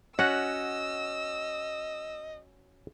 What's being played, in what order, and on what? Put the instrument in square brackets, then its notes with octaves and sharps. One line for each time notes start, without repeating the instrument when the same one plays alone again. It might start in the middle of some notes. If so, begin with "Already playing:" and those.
[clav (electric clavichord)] C#4 F#4 [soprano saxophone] D#5 [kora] F#5 [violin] E6